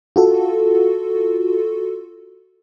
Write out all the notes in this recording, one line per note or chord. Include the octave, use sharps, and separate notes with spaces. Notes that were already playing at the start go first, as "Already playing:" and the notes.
F4 F#4 A4